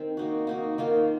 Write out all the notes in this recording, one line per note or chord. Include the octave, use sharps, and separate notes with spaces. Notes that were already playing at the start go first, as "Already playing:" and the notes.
Already playing: D#3 C4
A#3 D#4 F#4
A#3 D#4 F#4
D#3 A#3 F4 A#4